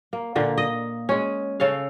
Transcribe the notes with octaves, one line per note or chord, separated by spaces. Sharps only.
A#3
A#2 D3 A#3
D#5
G#3 C#4
C#3 A4 C#5 F5